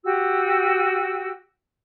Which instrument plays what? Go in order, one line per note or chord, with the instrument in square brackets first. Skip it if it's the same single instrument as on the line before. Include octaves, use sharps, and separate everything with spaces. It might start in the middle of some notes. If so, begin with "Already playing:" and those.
[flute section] F#4 G4 E6